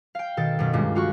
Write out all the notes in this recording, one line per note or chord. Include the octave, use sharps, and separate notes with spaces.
F5 G5
B2 D#3 A4 A6
F#2 B2
C#2 G2
F4 F#4 C#6